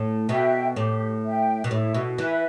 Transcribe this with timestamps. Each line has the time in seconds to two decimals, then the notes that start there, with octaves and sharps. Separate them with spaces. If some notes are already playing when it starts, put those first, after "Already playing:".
Already playing: A2
0.29 B2 E5 G5
0.76 A2 G4
1.24 E5 G5
1.64 B2
1.71 A2 E4
1.94 B2
2.18 E3 B4 E5